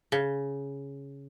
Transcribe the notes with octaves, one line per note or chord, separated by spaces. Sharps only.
C#3